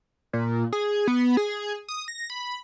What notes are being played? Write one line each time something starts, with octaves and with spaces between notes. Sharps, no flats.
A#2
G#4
B3
G#4
D#6
A#6
B5